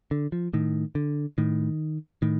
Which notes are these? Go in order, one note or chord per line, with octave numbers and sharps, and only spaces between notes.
D3
F3
A2 D#3
D3
A2 D#3
A2 D#3